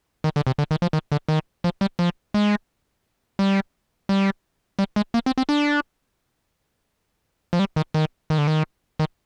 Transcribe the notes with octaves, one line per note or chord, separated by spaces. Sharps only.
D#3
D3
C3
D3
D#3
F3
D#3
D3
D#3
F3
G3
F3
G#3
G3
G3
G3
G#3
A#3
C4
C4
D4
F3
G3
D#3
D#3
D#3
D3
D#3
D#3